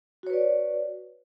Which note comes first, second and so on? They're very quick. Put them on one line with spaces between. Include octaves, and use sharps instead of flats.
F#4 C#5 B4 D5